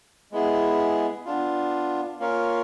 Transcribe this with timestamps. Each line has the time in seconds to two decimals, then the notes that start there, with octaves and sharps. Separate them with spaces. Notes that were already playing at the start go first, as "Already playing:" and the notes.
0.32 G#3 B3 E4 G#4
1.25 B3 D4 F4
2.19 A#3 C#4 F4 A#4 C#5